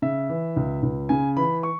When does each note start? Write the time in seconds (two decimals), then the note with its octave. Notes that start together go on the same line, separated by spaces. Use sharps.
0.02 C#3 E5
0.29 E3
0.56 C#2
0.83 C#2
1.09 C#3 G#5
1.36 E3 B5
1.63 C#6